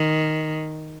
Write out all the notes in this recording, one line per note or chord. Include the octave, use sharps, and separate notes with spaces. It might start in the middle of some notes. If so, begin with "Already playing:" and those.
Already playing: D#3